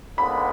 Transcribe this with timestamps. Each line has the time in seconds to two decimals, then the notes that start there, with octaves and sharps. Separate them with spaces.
0.18 D#2 D3 G#3 B3 B5